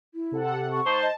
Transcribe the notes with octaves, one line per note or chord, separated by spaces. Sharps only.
E4
C3 A4 F#5
G4
C#6
G#2 D#4 C5 A5
D#5